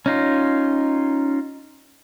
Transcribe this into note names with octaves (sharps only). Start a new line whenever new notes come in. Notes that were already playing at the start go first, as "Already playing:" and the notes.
C#4 D#4 F4